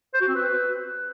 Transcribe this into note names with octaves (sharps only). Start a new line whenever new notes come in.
C5
F#4
C4
B4